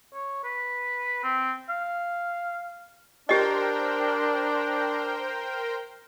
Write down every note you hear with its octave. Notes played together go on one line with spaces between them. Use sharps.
C#5
B4
C4
F5
D4 G4 A#4 C5 D#5 G5